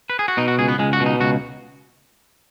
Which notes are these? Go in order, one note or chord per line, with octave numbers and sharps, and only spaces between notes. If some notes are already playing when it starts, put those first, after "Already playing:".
B4
G#4
F#4
B2 D#4
F#4
C#2 G#4
B3
C#2 G#3
F#4
B2
D#4
C#2 F#4